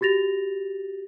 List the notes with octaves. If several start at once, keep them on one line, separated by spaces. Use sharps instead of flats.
F#4 G4 A6 A#6 F7